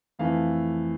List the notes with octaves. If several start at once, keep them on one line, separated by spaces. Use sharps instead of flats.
F2 E3 A3 F5